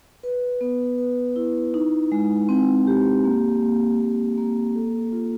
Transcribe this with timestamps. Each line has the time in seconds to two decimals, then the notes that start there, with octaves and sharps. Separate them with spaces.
0.23 B4
0.61 B3
0.98 B4
1.36 E4
1.74 D#4
2.12 G#3
2.49 C4
2.87 G4
3.24 A#3
3.63 A#3
4.00 A#3
4.38 A#3
4.75 A4
5.12 F4